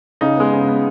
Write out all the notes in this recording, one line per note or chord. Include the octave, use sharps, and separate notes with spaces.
C#3 D#4
G#3 B3
C#3
G#3 B3